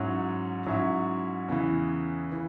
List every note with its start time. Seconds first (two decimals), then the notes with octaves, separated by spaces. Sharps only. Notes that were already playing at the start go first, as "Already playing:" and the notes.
Already playing: G#2 F#3 C#4 E4
0.66 G#2 F#3 C#4 E4
1.48 E2 C#3 E3
2.32 E3